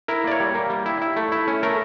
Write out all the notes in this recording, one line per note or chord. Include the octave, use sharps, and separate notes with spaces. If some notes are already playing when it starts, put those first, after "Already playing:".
E4 A#4
A#3 D5
C#5
G3
A#3
G3
E4
E4
A3
E4
C#4
A3 A#4